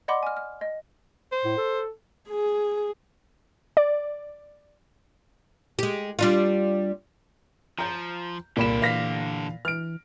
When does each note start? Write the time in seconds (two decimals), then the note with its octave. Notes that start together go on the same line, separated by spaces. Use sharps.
0.08 D5 D#5 F#5 B5 C6 D6
0.23 G#5 F6
0.37 F6
0.61 D#5
1.32 C5
1.45 A2
1.57 A4
2.29 G#4
3.77 D5
5.79 G#3 G4
6.19 G3 D4 F4
7.79 F3 A#5 G6
8.57 C2 A#2 D3 A#3 G4 B5 E7
8.82 E3 F5 A#6 B6
9.65 E3 F6 D7